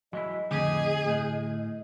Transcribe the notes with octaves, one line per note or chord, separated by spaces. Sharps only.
F#3 G#3 E4 D#5
F2 A2 D3 G4 G#4
A2